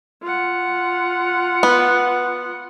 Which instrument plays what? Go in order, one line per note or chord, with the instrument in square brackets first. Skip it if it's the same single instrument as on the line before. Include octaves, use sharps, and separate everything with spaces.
[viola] F4 F#5
[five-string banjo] B3